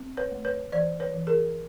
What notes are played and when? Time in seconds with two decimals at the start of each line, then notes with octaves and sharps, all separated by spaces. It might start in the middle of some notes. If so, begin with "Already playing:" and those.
Already playing: C4
0.17 B4 C#5
0.31 A3
0.45 B4 C#5
0.72 E3 C5 D5
1.00 B4 C#5
1.14 E3
1.27 G#4 A#4